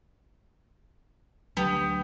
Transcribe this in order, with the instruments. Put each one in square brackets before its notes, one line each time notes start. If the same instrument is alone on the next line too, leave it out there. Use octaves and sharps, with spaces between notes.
[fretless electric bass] D2 F#3 D4 [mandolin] B3 G4